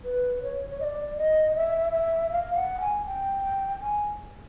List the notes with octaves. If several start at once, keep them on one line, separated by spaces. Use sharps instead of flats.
B4
C#5
C#5
D#5
D5
D#5
E5
E5
F5
F#5
G#5
G5
G#5